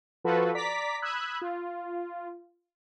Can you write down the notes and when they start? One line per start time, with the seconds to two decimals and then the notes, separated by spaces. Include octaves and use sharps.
0.24 F3 F4 F#4 A4 B4
0.55 D5 A#5 D6 B6
1.02 B5 D#6 E6 F#6 G#6
1.41 F4